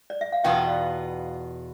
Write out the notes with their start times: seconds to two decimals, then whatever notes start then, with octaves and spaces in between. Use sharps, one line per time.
0.10 D5
0.21 E5
0.32 F5
0.44 E2 B2 B3 F4 E5 G5
0.68 D5 F5